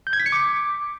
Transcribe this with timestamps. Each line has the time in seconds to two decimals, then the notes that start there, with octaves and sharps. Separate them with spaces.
0.07 G6
0.13 G#6
0.20 B6
0.26 C#7
0.32 D6